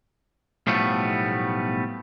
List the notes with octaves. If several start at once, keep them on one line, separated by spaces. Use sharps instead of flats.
B1 A2 F3 G3 A3 B3